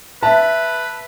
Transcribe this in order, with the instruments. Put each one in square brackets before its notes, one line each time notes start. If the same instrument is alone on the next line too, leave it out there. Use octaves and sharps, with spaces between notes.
[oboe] B4 [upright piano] E5 A5